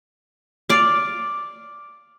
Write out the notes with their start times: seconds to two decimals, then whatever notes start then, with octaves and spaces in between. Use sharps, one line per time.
0.69 D5 F5